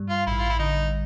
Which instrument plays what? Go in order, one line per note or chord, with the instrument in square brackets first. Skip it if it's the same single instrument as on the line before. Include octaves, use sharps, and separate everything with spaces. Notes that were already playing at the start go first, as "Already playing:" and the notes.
Already playing: [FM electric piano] G2 G3
[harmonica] F4
[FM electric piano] A1 [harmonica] E4
[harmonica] F4
E4
[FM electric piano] D3 [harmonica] D#4